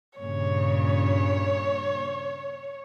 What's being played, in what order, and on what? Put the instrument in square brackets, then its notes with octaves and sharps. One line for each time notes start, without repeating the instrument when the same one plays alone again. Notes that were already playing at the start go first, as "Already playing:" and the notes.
[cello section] G2 A#2 C#3 [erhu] C#5